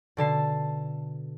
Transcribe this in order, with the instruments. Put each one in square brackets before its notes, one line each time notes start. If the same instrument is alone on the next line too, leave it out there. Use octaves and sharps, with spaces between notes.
[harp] B2 D3 A5 C7